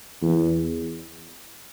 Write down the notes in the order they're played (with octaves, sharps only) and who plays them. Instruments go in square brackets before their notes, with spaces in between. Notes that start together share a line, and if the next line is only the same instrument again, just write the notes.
[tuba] E2